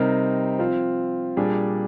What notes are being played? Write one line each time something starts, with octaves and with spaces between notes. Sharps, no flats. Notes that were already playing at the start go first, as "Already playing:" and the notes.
Already playing: C3 G3 C4 D#4 A#4
F3 C4 F4
A#2 G3 D4 G#4